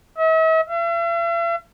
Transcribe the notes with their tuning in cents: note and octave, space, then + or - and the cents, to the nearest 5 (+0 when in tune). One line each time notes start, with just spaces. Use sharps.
E5 -45
E5 +45